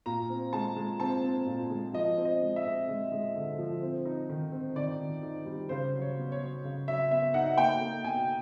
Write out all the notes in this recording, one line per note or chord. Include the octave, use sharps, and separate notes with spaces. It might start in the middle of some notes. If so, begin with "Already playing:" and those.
A#2 A#5
C4
G#3 A5
G#3
C4 A5
C4
A#2
G#3
F3 D#5
C4
D#5
G#3
E5
C4
G#3
G#3
D3
F3
C4
D#4
D#3
C4
D#3 D5
D#3
D#4
G3
C#3 C5
F#3
C#5
B3
C#5
F#3
C#3
F#3 E5
B3 E5
D#4 F#5
A#3 G5
A#3
B2 G#5